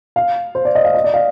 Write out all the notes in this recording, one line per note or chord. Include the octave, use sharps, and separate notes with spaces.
F5
C5
D5
D#5
F5
D#5
D5
F5